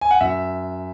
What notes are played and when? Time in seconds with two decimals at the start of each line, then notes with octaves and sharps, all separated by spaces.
0.01 G#5
0.11 F#5
0.21 F#2 E5